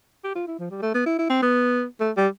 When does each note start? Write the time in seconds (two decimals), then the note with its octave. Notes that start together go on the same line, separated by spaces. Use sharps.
0.24 G4
0.35 F4
0.47 E4
0.59 F3
0.71 G3
0.82 A3
0.94 B3
1.06 E4
1.18 E4
1.30 C4
1.42 B3
2.00 A3
2.17 G3